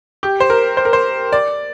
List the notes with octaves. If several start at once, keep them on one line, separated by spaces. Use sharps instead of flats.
G4
C5
A#4
C5
A#4
C5
D5